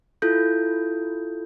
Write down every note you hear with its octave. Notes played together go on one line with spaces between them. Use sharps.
E4 F4 A4 G6